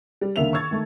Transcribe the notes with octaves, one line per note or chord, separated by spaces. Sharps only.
G3
C#2 D3 D#3 A#3 E5 F7
C#6 E6 G#6 A6
D#3 A3